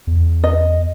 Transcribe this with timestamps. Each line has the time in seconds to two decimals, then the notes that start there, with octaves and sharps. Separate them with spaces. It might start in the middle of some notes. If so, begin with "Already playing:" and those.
0.07 E2
0.44 D#5